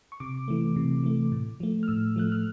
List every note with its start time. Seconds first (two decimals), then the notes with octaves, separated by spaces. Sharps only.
0.12 C#6
0.20 C3 D6
0.48 E3 A3
0.76 C3
1.03 E3 A3
1.32 A2
1.60 F3 A3
1.83 F6
1.88 A2 E6
2.16 F3 A3 F#6
2.32 F6